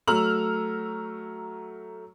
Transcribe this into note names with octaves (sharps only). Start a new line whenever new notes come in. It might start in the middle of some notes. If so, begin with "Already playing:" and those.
F#3 A3 A#5 E6 F6 F#7